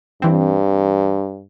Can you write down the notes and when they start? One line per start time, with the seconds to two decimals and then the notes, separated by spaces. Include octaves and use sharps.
0.22 G2 E3 C4